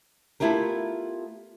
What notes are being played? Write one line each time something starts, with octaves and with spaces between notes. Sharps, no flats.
A3 B3 E4 F4 G4 A#4